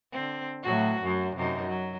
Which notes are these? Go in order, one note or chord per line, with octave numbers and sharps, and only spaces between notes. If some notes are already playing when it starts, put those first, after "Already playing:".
D3 C4
A2 F#3 F#4
F#2 F#3
F#2 C3 D#4
F#3